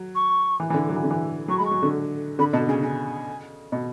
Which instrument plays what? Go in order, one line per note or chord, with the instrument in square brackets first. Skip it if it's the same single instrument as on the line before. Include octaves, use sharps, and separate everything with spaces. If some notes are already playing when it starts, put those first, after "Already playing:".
Already playing: [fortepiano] F#3
[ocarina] C#6
[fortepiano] E3
E3
D3
F#3
E3
D3
E3
[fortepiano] F#3 [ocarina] C#6
[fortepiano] G#3 [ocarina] B5
[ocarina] C#6
[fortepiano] F#3
D3
[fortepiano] D3 [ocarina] B5
[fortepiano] B2 [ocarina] A5
[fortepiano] C#3 [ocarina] G#5
[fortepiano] C#3 [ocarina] G#5
[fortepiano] B2